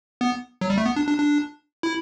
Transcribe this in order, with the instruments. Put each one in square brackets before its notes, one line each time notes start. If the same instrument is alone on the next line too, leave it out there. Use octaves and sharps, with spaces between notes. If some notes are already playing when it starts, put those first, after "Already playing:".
[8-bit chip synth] B3
F#3
G3
A3
B3
D4
D4
D4
E4